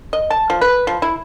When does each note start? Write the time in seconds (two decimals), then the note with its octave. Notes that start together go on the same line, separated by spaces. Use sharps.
0.13 D#5
0.30 A5
0.50 F3
0.61 B4
0.87 F3
1.02 E4